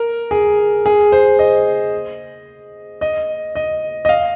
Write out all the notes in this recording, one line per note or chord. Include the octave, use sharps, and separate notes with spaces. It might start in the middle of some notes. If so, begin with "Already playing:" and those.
Already playing: A#4
G#4
G#4
C5
D#5
D#5
D#5
D#5
F5